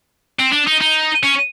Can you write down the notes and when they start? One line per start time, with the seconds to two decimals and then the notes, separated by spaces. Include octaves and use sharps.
0.39 C4
0.52 D4
0.67 D#4
0.81 D#4
1.23 C#4